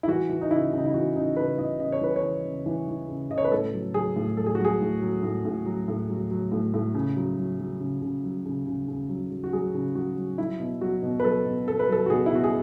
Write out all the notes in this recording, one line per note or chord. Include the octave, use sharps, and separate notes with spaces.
E4
E3 F#4
E3
D#4
C#3 E4
C#3 D#4
E4
E3 F#4
C#3 D#4
C#3 B4
E3 D#5
C#3 D#5
C#5
E3 B4
C#5
E3
C#3
E3
E3
C#3
C#3 D#5
C#5
B4
A2 A4
F#3
F#3 G#4
A2
F#3 A4
G#4
F#4
F#3
G#4
A2
F#3
A2
A2
F#3
A2
F#3
F#3
A2
A2
C#3
F#3
F#3
F#3
C#3
C#3
F#3
C#3
C#3
C#3
F#3
F#3
F#4
F#3 G#4
C#3
F#3 F#4
F#3
F#3 E4
B2
F#3 F#4
B2
B4
F#3 A4
B2
B2 A4
B4
F#3 A4
F#4
B2 G#4
E4
B2 F#4
G#4